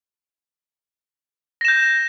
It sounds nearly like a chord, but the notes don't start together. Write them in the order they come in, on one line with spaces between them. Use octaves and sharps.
A#6 E7 G6